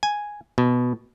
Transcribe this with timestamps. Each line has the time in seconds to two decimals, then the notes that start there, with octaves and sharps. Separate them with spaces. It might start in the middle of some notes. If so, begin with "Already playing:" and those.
0.03 G#5
0.58 B2